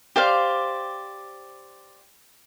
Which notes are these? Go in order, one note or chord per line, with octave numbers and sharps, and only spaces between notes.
G4 C5 D5 F5